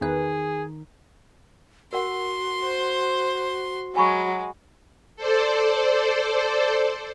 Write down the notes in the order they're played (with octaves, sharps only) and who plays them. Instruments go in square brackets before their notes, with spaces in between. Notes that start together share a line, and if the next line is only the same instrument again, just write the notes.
[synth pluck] E2 B4 [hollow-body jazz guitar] D#3 [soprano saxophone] G#4
[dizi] F#4 [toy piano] A#4 F#5 [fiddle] C6
[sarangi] C5
[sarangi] F#3 [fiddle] G#3 [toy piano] G#5 B5 C#6
[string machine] A4 C5 D5